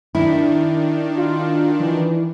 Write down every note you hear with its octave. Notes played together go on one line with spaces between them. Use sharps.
D#3 D4 E4
F4
E3